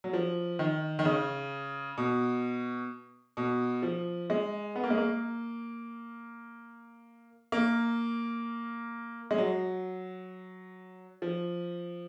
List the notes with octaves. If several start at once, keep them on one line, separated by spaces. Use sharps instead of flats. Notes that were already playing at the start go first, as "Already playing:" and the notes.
F#3
F3
D#3
D#3
C#3
B2
B2
F3
G#3
B3
A#3
G#3
A#3
A#3
G#3
F#3
F3